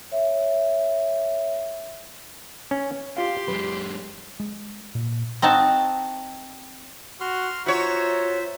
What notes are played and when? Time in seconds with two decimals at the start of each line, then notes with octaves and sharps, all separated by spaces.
0.11 C#5 E5
2.71 C#4
3.17 F4 G4 F5 C6
3.48 F#2 G#3 B4
4.40 G#3
4.95 A#2
5.42 C4 D#4 F#4 A5
7.21 F#4 C6 F6
7.66 F4 F#4 C5 C#5 E5 A#5